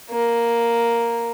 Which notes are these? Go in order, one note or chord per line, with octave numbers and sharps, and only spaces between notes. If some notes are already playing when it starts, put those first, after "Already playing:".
A#3